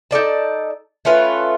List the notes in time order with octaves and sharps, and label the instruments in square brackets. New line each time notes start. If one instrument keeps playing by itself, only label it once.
[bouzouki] D#4 A4 D5 A5
A3 C#4 F4 B4